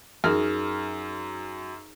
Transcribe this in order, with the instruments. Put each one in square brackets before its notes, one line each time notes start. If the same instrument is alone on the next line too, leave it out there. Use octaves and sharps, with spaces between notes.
[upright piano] F#2 F6 [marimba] D#4 G#4 A#4